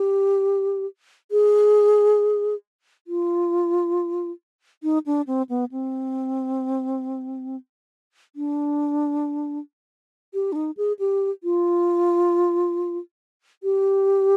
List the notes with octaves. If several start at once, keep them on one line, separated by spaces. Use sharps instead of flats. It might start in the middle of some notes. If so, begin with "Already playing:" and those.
Already playing: G4
G#4
F4
D#4
D4
C4
B3
C4
D4
G4
D4
D#4
G#4
G4
F4
G4